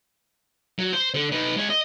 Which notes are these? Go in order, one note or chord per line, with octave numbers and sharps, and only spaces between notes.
F#3
C5
D3
D#4 B4
G#3 C#5
D#5